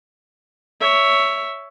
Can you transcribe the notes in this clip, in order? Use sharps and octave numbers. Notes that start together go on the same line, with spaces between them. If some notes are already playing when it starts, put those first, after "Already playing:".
C#5 E5